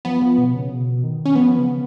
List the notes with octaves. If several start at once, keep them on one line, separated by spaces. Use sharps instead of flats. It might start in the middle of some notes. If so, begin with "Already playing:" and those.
F3 B3
F3
B2
C#3
B2
D#3
C#4
F3 B3
C#3